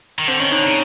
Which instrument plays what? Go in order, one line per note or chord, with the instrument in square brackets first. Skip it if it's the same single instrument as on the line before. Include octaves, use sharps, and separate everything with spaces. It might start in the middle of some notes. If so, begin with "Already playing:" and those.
[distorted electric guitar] D#3
[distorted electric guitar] D3 [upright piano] C4
[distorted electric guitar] D#3 [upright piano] C#4
[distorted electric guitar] D3 [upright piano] D#4
[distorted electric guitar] C#3 [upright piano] D#4